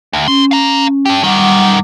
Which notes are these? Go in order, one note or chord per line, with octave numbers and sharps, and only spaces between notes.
D2
C#4 C6
F5 A#5
D4 G4
F#2 D#3 G3 F#5 D6